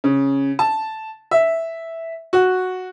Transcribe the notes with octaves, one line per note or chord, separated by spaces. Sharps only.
C#3
A5
E5
F#4